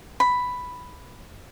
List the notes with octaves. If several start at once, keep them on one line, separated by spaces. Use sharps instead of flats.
B5